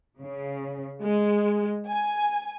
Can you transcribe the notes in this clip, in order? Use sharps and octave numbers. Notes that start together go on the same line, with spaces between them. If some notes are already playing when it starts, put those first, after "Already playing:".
C#3
G#3
G#5